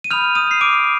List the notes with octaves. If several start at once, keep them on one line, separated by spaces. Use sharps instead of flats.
D#7
B5 D#6 F6 G6 F7
D#6 D#7
C7
D6 D7